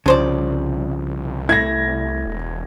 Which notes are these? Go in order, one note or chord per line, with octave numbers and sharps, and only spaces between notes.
C2 C#3 F3 D4 C5 D5
A3 E4 G#6 A#6
E1